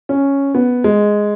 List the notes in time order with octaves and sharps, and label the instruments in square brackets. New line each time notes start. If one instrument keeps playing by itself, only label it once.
[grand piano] C#4
B3
G#3